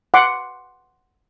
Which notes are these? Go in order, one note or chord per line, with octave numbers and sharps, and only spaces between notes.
F#5 C6 D6